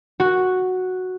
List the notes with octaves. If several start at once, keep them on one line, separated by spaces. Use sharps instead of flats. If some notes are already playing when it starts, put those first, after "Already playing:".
F#4